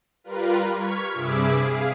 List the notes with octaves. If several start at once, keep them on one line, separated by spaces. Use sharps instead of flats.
G3 F4 A#4 B4
C#6 F6 G#6 B6
G2 C3 G#4 E5 B5 D6
G#4 F5